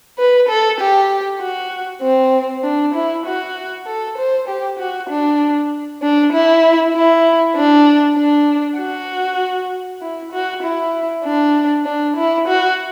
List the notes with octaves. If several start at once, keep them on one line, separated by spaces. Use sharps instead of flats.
B4
A4
G4
F#4
C4
D4
E4
F#4
A4
C5
G4
F#4
D4
D4
E4
E4
D4
D4
F#4
E4
F#4
E4
D4
D4
E4
F#4